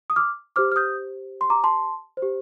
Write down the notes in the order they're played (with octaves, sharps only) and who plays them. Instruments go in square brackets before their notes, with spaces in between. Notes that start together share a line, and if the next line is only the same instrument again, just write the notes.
[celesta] D#6
D6 F6
G4 C5 D6 F6
F6
D#6 G6
C6
A#5 D6
A5 C6
C5
G4